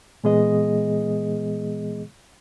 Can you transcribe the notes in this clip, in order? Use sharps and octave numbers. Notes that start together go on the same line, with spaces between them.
A#2 E3 G#3 B3 G#4 D#5